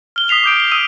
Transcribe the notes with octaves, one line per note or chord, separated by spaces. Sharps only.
F6 G7
D#6 B6 C7 F7 G7
D6 G6 D7
C7 G7
D#6 E6 D#7